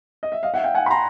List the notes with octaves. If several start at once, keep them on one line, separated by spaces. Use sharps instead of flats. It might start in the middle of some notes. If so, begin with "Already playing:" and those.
D#5
E5
D#5 F5
E5 F#5
F5 G5
F#5 G#5
B5
A#5 C6